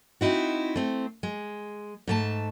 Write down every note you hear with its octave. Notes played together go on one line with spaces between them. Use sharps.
C4 C#4 D#4 E4 F#4
A3 C4
G#3
G#2 A3 A5